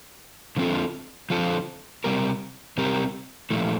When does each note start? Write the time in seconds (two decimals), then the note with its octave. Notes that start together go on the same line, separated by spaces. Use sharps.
0.56 D3 F3 C4 F4 A4
1.30 D3 F3 C4 F4 A4
2.04 C3 G3 C4 G4 A#4
2.78 C3 G3 C4 G4 A#4
3.50 A#2 F3 A3 E4